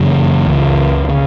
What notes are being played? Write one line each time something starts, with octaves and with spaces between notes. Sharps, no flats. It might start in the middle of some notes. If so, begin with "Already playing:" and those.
Already playing: F#2 C#3 E3
C#2 C#3
C#3